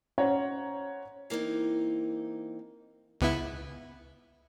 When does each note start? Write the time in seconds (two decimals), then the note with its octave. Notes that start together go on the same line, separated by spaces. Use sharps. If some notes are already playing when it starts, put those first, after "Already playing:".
0.18 C#4 C5 C#5 F#5 A#5
1.30 E3 A#3 C4 D#4
3.21 C#2 B3 E4